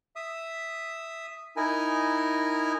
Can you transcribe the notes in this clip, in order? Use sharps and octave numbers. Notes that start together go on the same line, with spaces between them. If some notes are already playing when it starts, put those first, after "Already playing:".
E5 D#6
D#4 E4 A#4 G#5